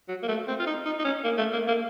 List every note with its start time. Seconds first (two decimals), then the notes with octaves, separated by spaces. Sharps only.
0.08 F#3
0.23 A#3
0.28 A3
0.48 C4
0.59 F4
0.67 D#4
0.85 D#4
0.99 D#4
1.05 C#4
1.24 A#3
1.38 A3
1.53 A#3
1.68 A#3